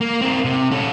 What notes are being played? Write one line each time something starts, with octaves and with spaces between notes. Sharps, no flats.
A#3
C4 A#4
C3
C#4 A4